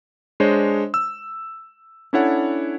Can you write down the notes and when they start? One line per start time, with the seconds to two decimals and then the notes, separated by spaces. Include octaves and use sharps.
0.40 G#3 D4 C5 C#5 D#5
0.94 E6
2.13 C#4 D4 E4 A4 C#5 F#5